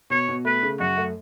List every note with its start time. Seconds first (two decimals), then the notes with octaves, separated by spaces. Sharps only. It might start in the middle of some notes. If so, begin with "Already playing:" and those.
0.10 B2 C#5
0.28 B2
0.45 A3 B4
0.62 C#3
0.80 F#2 F#4
0.97 A3